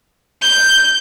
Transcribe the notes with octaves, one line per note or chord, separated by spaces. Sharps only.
G6